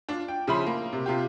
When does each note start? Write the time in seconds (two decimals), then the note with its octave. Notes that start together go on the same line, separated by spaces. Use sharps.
0.08 D4 F4
0.28 G5
0.47 C#3 F3 E4 B5 C6
0.66 A#3
0.93 C3
1.06 C3 F4 G4